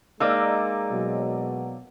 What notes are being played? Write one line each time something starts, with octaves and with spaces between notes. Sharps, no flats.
G#3 A#3 D#4 D5 D6 E6
B2 F#3